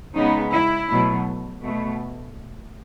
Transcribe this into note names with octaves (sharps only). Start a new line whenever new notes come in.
C#3 G#3 B3 D#4
E4
B2 F#3 A3
B2 A3